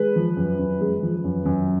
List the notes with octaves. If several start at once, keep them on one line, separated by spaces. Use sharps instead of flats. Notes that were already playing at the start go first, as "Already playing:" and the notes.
Already playing: G#3 B4
F3
F#2
F#2
G#3
F3
F#2
F#2